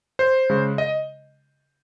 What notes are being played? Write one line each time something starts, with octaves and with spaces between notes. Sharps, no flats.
C5
C#3 G#3
D#5